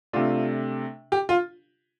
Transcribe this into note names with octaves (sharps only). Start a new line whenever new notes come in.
C3 A3 D4 F4
G4
F4